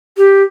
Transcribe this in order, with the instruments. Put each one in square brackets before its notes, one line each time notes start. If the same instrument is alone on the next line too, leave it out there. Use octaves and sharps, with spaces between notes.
[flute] G4